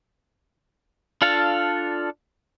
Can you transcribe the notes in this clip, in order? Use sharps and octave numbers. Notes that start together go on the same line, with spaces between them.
D4 F4 A4 F5 A5